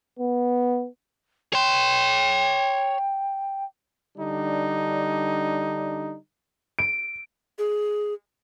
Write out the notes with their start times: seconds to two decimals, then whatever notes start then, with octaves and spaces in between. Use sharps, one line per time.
0.19 B3
1.53 C#5 G5 C6
4.17 D3 G3 D4 D#4
6.79 D7
7.58 G#4